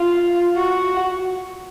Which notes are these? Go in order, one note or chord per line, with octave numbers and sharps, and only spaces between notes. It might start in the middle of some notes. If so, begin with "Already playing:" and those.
Already playing: F4
F#4